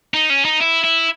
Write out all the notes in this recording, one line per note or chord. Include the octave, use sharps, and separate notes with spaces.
D#4
C#4
D#4
E4
E4